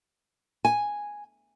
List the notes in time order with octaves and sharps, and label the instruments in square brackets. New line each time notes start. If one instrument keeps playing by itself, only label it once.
[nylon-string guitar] G#5